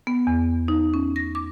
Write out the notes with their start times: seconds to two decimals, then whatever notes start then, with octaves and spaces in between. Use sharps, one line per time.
0.07 B3
0.27 E2
0.68 D#4
0.94 C#4
1.16 A#6
1.35 D6